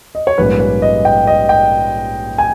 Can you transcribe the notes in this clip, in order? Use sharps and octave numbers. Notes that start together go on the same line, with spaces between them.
D#5
C#5
A#1 G#2 G3 A#3 C#4 B4
B4
D#5
G5
D#5
G5
G#5